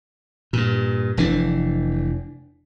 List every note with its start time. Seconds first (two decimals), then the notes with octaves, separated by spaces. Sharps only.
0.53 G2 A#2
1.17 F1 E3 D4